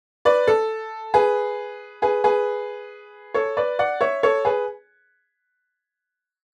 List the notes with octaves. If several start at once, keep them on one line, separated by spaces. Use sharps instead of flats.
B4 D5
A4
G#4 B4
G#4 B4
G#4 B4
A4 C#5
B4 D5
D5 F#5
C#5 E5
A4 C#5
G#4 B4